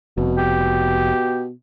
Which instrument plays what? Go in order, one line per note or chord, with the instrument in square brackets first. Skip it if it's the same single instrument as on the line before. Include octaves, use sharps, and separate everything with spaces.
[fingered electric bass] F1 [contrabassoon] B2
[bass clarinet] G4